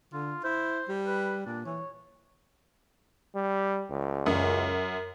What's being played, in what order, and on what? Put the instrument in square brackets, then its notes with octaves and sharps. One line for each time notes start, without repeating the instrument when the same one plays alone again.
[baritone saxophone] D3 [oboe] F4
[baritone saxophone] E4 [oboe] C5
[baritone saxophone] G3
[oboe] B4
[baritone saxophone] A#2 [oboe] D4
[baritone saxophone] E3 [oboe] C#5
[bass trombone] G3
C#2
[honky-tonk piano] F#2